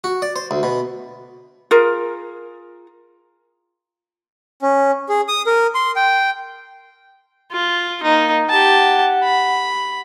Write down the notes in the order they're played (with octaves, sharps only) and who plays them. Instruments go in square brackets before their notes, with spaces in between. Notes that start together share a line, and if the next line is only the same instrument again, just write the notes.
[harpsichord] F#4
D5
C5
D2
B2
[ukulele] F4 G#4 A#4
[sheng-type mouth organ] C#4
G#4
D#6
A#4
C6
G5
[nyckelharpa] F4
[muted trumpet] A#3 [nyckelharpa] D#4
[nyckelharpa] G4 A5 [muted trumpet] F#5
[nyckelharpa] B5